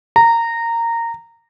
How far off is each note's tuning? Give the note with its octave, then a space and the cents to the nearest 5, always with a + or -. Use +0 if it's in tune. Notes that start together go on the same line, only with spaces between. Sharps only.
A#5 -15